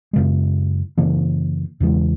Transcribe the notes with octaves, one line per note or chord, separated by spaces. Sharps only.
F#2 C#3 G#3
F#2 C#3 E3 A#3
E2 C#3 E3 G#3